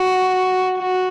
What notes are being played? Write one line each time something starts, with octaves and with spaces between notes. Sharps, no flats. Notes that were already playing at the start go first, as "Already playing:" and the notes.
Already playing: F#4
F#4